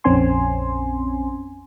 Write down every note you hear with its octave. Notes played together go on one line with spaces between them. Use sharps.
A#1 F2 C4 C#4 G#5 C6